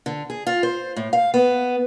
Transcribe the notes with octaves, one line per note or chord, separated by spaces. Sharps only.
D3
G#4
F4
C5
A2
F5
B3